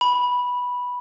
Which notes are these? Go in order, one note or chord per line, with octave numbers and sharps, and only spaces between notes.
B5